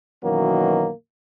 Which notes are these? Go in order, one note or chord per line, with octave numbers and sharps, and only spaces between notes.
F#2 B2 D#3 E3 F#3 A#3